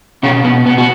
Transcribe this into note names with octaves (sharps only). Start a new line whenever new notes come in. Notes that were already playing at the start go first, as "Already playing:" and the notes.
B2 C#4
B2 B3
B2 B3
F#4